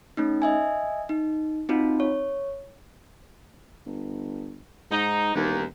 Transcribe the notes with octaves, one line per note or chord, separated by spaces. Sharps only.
A3 C#4 D#4
D#5 E5 G#5
D#4
C4 D#4 F4 F#4
C#5
G1
G#2 D#4
E1 D#2